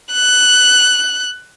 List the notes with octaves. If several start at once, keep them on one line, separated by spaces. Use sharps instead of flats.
F#6